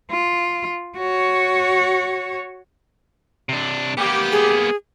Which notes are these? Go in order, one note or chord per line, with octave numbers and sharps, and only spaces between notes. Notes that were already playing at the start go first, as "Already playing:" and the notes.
F4
F#4 C#5
C3 D4
A#3 B3 G4
G#4